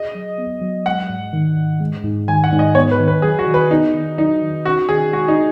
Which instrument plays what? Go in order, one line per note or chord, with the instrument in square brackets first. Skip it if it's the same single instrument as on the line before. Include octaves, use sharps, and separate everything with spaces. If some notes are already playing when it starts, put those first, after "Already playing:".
Already playing: [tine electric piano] G#4 [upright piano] D#5
[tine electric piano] F#3
B3
F#3
[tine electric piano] G#3 [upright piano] F#5
[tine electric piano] G#2
D#3
G#2
G#3
G#2
[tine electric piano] D#3 [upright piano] G#5
[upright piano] F#5
[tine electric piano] G#2
[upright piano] D#5
[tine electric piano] B3 [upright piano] C#5
[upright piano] B4
[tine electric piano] D#3
[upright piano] B4
[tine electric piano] F#3 [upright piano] G#4
[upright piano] F#4
[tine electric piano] D#3
[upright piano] B4
[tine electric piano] B3 [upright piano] D#4
[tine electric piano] D#3
[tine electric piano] F#3 [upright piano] D#4
[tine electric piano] D#3
[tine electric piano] C#4 [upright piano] F#4
[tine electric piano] D#3 [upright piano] G#4
[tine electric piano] G#3 [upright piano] F#4
[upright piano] D#4